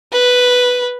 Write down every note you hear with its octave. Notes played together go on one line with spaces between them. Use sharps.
B4